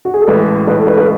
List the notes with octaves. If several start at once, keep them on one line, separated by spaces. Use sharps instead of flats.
F#4
G#4
A4
A1 A2 G#3 B4
A1 A2 G#3 B4
A4
B4
B4